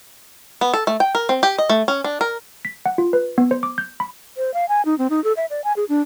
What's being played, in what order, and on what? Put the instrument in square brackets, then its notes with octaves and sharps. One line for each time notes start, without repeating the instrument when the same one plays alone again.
[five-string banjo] B3
A4
A3
G5
A#4
C4
G4
D#5
A3
C#4
D4
A#4
[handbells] B6
F#5
F4
B4
B3
C5
D6
G6
B5
[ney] C5
F5
G#5
D#4
C4
D#4
A4
E5
D5
G#5
G#4
D4